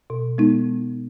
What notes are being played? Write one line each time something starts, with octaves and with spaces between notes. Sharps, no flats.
B2
G#3 B3 D#4